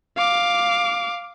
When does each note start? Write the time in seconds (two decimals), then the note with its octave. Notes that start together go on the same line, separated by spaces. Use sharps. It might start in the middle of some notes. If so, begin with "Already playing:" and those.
0.17 F5 D6